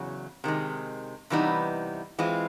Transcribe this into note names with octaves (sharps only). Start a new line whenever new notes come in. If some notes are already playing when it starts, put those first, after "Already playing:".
Already playing: E2 C#3 F#3
C3 D#3 G#3
C3 E3 G3 B3 D#4
E3 G#3 C4 F4